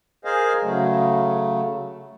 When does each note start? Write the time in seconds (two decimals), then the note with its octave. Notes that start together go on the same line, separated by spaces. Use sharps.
0.25 G#4 A#4 C5 D#5 F5 G#5
0.62 C#3 F#3 A3